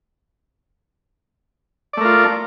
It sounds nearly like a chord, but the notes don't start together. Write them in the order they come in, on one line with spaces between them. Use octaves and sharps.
D5 A3 A#4 F4